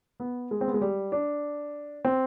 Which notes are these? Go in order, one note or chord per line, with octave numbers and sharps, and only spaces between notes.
B3
G#3
C4
B3
G#3
G3
D4
C4